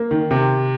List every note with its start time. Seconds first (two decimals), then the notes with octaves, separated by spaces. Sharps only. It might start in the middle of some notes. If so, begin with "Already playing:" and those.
Already playing: A#3
0.11 D#3
0.31 C3